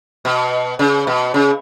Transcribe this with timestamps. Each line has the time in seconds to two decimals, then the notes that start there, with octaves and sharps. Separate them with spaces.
0.25 B2
0.79 C#3
1.07 B2
1.34 C#3